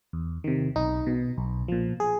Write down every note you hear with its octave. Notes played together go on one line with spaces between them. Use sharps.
E2
C3 D#3
B1 D#4
B2
B1
A#2 F3
G#4